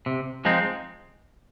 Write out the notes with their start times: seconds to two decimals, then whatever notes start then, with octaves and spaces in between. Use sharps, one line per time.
0.06 C3
0.45 F3 G#3 C4 D#4